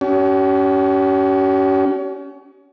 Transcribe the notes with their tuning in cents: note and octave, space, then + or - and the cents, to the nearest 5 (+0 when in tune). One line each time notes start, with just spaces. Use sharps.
C#4 +30 G4 -45